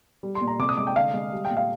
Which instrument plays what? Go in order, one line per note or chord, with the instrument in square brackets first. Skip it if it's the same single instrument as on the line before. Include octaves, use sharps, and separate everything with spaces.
[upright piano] G3
C6
A#2
A#5
C3 D6
D#6
G#3 D6
G5
D3 F5
G#3
G3
G5
A#2
F5